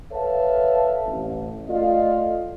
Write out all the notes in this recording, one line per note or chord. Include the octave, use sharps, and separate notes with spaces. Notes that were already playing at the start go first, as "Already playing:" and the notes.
A4 B4 C#5 E5 F5 A5
A1
A3 F4 D5 D#5 F5